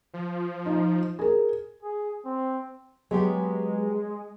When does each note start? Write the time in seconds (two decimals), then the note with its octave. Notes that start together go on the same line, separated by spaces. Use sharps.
0.14 F3
0.66 D#4
1.19 G#4 A#4
1.83 G#4
2.25 C4
3.11 F#3 G#3 B3 G4